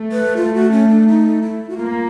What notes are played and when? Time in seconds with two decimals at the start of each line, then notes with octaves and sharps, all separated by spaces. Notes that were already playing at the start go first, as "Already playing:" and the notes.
Already playing: A3
0.12 B4
0.37 F4
0.55 F#4
0.72 C#4
0.89 D4
1.08 D#4
1.42 E4
1.70 F#4
1.78 A#3 F4